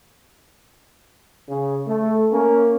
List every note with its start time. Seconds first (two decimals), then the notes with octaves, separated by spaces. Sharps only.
1.48 C#3
1.87 A3
2.30 A#3 C#4